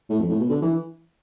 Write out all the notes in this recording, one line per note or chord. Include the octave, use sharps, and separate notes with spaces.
A2
F2
A2
B2
D3
E3